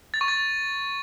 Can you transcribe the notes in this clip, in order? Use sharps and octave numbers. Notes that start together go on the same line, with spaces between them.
A6
C#6
A6